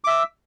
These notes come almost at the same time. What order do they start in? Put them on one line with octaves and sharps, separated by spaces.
D6 E5 E6